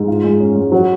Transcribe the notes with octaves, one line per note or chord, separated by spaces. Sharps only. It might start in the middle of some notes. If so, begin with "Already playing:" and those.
Already playing: G#2
F4
G#3
C#4
G#3
F#3